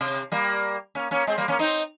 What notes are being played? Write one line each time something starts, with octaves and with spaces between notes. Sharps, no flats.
C3
G3 A#3
A#3 C#4
A#3 C#4
G#3 C4
G3 A#3
A#3 C#4
C4 D#4